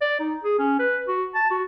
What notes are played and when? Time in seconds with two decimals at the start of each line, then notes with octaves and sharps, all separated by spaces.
0.01 D5
0.20 D#4
0.43 G#4
0.59 C#4
0.79 B4
1.08 F#4
1.35 A5
1.51 F#4